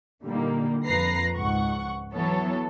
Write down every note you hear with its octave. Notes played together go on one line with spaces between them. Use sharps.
A#2 D3 G3 A#3 D#4
F2 F3 B4 A#5 A#6 C7
C#2 G#2 F#5 C#6
E3 F#3 B3 A4 C#5